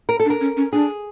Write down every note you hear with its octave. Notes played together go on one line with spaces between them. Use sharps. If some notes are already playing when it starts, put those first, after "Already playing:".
A#4
A4
D4
A#4
C#4
C#4
D4 G#4